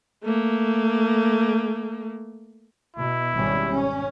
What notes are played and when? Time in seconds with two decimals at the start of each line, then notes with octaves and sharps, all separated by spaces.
0.24 A3 A#3
2.97 B2 E4
3.34 G#1 G3 C#4
3.71 C#4